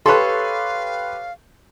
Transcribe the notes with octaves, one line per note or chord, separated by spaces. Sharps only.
G4 A4 B4 C#5 F5 C6